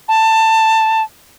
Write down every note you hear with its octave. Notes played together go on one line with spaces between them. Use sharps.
A5